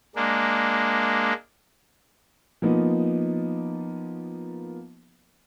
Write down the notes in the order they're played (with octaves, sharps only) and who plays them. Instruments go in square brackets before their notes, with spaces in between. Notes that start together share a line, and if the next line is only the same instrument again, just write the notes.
[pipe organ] G#3 A#3 D4
[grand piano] F3 A#3 B3 D#4 F4